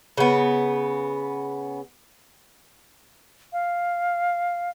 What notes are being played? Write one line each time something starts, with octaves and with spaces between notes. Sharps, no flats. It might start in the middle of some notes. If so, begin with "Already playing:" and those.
C#3 B3
F5